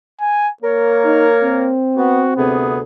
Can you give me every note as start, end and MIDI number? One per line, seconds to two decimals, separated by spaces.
0.21 0.49 80
0.62 1.71 58
0.62 1.76 70
0.62 1.76 73
1.05 1.28 63
1.43 2.81 60
1.97 2.21 59
1.97 2.34 66
2.37 2.82 38
2.37 2.82 48
2.37 2.79 59
2.37 2.82 68